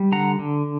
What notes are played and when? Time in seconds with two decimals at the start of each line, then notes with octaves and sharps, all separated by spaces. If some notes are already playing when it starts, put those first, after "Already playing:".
Already playing: G3
0.12 D3 F#5 A#5
0.39 D3